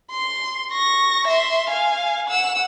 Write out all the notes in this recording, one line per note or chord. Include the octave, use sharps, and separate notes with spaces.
C6
C#6 A#6
E5 C6
F5 G#5
F#5 E6